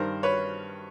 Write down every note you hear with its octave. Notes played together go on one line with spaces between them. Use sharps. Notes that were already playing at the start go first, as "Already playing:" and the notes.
Already playing: G2 D#3 G3 A#4 C5
B4 C#5